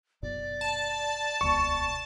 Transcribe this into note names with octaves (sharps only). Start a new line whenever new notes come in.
F#1 B2 D5
A5
D#1 C#2 B2 C#6